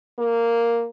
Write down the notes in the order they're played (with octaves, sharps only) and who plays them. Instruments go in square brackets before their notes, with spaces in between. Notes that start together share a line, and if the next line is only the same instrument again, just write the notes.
[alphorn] A#3